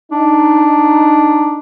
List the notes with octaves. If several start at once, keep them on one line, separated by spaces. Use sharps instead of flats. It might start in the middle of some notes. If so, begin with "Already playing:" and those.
D4 D#4